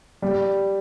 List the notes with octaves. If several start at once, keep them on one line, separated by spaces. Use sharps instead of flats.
G3